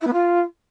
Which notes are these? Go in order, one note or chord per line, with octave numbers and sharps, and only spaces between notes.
E4
B3
F4